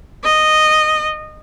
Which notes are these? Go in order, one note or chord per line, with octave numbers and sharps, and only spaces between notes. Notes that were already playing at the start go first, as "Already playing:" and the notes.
D#5